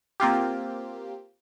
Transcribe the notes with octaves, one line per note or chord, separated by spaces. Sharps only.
A#3 C4 F4 G4